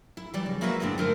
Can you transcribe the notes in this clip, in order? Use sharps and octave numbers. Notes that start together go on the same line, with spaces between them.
E4
E3 G3 D5
C#3
G#3 A#3 E4 F#4 B4 E5
D2 G2 G#3 C4 D4
D3 A3 A#4 C5